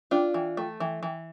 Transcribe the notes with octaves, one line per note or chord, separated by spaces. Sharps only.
D4 F4
E3
A3
E3
E3